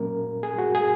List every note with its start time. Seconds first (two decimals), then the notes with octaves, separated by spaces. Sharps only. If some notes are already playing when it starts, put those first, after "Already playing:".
Already playing: A#2 F#3 A#3 C#4 A#4
0.43 G#4
0.58 F#4
0.75 G#4